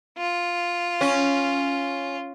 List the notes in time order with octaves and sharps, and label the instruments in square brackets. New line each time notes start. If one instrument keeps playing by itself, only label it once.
[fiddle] F4
[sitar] C#4